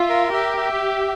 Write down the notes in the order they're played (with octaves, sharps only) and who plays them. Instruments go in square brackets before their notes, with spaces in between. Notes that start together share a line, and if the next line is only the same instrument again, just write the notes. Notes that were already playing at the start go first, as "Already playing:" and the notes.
Already playing: [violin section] F4 [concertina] E5
[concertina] A#4
[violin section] G4 [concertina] E5
[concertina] E5